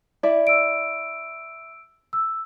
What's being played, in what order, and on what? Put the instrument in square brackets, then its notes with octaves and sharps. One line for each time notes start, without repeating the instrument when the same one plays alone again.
[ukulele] E4 D5
[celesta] E6 D7
E6